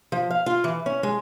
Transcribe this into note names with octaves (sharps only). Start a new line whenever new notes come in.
F3
F5
F4
E3
C#4
G#3